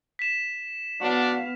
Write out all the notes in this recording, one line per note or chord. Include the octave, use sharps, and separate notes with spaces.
B6 E7
B3 D4 F#4 F5